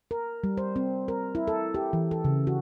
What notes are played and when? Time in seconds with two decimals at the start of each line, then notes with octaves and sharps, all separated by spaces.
0.11 A#4
0.44 G3
0.57 C5
0.76 C4
1.08 A#4
1.35 E4
1.47 A4
1.74 G4
1.93 E3
2.11 A4
2.25 C#3
2.47 F#4